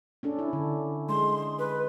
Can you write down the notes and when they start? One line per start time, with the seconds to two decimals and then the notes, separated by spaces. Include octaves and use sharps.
0.23 C#4 D4 A4
0.39 E4
0.53 D3
1.09 G#3 C6
1.59 B4